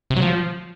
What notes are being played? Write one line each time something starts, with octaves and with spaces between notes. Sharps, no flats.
C3
F#3
F3